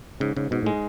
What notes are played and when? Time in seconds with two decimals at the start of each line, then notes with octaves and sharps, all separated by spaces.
0.20 G#2 C#3
0.36 G#2 C#3
0.51 G#2 B2
0.62 A2
0.66 G#3